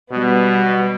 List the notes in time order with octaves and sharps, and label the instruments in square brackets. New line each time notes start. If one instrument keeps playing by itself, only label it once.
[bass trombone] B2 [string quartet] G3 B3